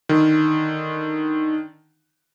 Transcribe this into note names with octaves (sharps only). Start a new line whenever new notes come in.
D3 D#3